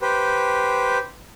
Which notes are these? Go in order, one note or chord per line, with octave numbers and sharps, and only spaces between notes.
G4 B4 C5